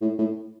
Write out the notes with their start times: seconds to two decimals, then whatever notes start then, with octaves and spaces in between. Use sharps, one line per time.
0.01 A2
0.19 A2